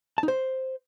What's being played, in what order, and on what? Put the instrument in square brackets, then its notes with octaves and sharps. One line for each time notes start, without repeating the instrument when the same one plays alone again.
[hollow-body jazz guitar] A5
D#4
C5